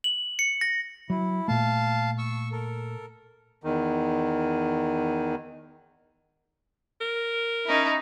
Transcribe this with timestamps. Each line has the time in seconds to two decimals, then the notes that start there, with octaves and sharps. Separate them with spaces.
0.04 F#7
0.39 C#7
0.61 A#6
1.10 F#3 E4
1.48 A#2 A3 F5 A5
2.18 C#6 E6
2.52 A4 A#4
3.64 E2 D#3
7.01 A#4
7.66 C#4 D#4 E4